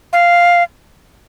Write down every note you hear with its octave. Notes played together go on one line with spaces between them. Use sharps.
F5